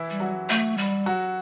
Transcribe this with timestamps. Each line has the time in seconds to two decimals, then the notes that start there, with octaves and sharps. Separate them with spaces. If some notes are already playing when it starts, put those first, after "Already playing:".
Already playing: E3 E4
0.11 G3
0.20 F#3 F#4
0.49 A3
0.78 G3
1.06 F#3 F#4